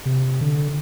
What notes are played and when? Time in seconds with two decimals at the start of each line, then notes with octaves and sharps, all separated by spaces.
0.06 C3
0.41 D3